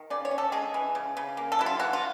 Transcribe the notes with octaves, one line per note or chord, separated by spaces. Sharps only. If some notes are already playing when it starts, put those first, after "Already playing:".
Already playing: D#3
C#3 D5
C#5
C#4
A4
G#3 G#4
E3
C#3
C#3
A#3
A4
F#3 E4
F4
E3 F#4
F4